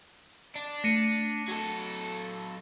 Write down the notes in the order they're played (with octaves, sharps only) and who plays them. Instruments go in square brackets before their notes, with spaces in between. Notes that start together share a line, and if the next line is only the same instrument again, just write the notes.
[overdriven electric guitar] D4
[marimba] A3 [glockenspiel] A#6 C#7 D#7
[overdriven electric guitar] F#3 A4